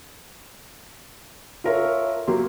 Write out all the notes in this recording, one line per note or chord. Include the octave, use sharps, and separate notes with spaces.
F4 A4 A#4 C#5 E5
F#3 A#3 G4 C6